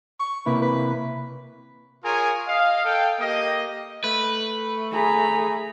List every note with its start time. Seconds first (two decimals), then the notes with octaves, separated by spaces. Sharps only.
0.20 C#6
0.46 C3 A#3 E4 B4
0.62 B4
2.04 F4 G#4 A#4 C#5 G#5
2.47 D#5 F5
2.84 A4 F5 G5
3.20 A#3 G4 D#5
4.04 A3 B4
4.92 G#4 A#5 B5